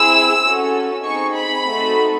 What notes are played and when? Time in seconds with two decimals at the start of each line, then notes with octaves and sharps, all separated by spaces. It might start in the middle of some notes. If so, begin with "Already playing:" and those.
Already playing: C4 E4 G#4 E6
0.43 C#4 F#4 A4
1.04 C4 D#4 G#4 C#6
1.35 B5
1.66 A3 C4 D#4 F#4 A4